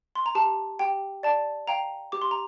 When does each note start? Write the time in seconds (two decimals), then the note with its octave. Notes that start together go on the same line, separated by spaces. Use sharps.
0.15 C6
0.26 A#5
0.35 G4 A5
0.79 G4 G5
1.23 D5 A5
1.68 F5 G5 A#5
2.12 G4 D6
2.22 C6
2.31 A#5